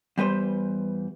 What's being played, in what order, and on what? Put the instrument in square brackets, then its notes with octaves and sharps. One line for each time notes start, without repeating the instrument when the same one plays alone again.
[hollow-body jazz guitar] E2 G3 B4 C5